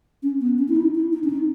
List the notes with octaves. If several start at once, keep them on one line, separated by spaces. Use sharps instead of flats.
C#4
B3
C#4
E4
D#4
E4
D#4
C#4
D#4